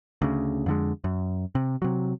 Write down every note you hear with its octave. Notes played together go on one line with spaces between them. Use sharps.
D2 C#3
F2 D3 G#3
F#2
C3
C3 F#3